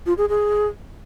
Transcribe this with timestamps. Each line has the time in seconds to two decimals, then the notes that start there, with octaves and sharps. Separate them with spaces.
0.06 F4
0.18 G#4
0.29 G#4